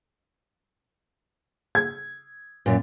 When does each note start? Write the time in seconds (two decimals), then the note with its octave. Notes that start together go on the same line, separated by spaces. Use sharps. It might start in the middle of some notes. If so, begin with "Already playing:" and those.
1.75 G#6
2.66 F#2 A#2